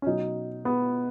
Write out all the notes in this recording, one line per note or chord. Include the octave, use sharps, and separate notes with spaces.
C#4
B2 F#3 D#4
B3